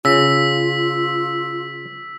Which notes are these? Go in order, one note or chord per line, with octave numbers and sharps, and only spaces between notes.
C#3 F4 E6 B6